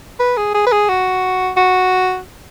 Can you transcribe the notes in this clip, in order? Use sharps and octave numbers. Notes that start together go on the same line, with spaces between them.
B4
G#4
G#4
B4
G#4
F#4
F#4